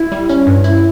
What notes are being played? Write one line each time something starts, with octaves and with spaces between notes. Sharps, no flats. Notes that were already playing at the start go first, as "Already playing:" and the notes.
Already playing: E4
G3
C#4
G2
E4